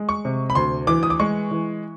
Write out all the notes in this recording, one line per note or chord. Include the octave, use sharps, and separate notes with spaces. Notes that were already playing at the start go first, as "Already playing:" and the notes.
Already playing: G#3
C#6
C3
B5
D2 C6
E3 D6
D#6
D6
G#3 C#6
E3